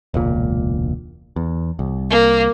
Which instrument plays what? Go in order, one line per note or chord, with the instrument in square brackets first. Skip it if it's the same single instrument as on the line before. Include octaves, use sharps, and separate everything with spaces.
[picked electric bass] E1 C#2 A#2
E2
C2
[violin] A#3